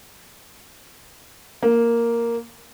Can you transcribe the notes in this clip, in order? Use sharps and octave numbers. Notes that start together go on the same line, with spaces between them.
A#3